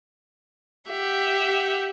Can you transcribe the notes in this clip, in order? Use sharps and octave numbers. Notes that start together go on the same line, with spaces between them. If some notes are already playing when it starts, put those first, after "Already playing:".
G4 E5 F#5